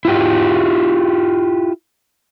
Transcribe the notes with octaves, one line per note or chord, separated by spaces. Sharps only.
E4 F4 G4